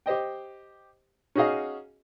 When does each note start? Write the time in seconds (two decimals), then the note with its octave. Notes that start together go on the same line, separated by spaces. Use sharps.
0.06 G4 C5 D#5 G5
1.35 C#4 D#4 F#4 G#4 D#5 F5